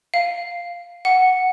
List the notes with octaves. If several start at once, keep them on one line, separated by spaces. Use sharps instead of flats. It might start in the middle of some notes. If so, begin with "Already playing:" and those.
F5
F#5